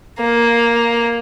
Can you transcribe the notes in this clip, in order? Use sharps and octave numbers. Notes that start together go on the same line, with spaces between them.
A#3